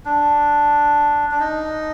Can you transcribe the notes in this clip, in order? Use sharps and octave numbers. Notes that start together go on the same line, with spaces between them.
D4
D4
D#4